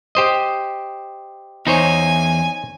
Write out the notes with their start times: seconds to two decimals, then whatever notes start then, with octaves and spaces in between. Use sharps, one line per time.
0.15 G4 C5 D#5
1.67 E2 D#4 C5 C#5 G#5